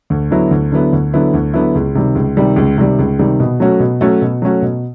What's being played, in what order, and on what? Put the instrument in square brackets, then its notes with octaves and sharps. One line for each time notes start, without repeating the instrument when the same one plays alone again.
[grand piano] D2
D3 F#3 B3 E4
D2
D3 F#3 B3 E4
D2
D3 F#3 B3 E4
D2
D3 F#3 B3 E4
C#2
C3 D#3 G3
C#2
C3 D#3 G3
C#2
C3 D#3 G3
C#2
C3 D#3 G3
B2
F#3 A3 C#4 F#4
B2
F#3 A3 C#4 F#4
B2
F#3 A3 C#4 F#4
B2